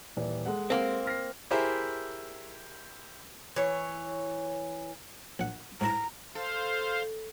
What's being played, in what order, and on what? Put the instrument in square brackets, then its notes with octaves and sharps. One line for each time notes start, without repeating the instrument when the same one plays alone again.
[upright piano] D#1 E3 D5
G#3 A4 F#5
[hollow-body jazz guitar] A#3 C4
[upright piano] F6 A#6 C7
[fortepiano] E4 G4 G#4 A#4 C5 E5
[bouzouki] E3 C#5
[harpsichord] A#1 F#5
[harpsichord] G#2 E4 A5 [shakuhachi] A#5
[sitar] A4 [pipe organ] C5 F5